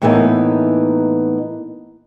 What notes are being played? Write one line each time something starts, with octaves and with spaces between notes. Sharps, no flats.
A2 E3 A#3 B3 D#4